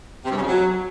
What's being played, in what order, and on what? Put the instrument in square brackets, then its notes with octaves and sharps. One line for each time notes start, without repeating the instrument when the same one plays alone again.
[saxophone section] C3
G2
C#3
F2
F#3